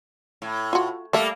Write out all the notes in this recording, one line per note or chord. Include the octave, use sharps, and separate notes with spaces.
A2
F4 F#4
G3 A3 A#3 A4 E5